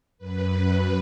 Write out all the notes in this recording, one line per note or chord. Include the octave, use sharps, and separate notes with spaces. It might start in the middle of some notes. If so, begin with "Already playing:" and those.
F#2 B4